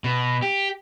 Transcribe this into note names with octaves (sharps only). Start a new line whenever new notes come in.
B2
G4